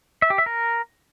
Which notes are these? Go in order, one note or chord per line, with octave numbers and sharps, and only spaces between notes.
E5
G4
E5
A#4